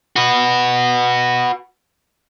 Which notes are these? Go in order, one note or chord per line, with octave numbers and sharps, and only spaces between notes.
F#4 B4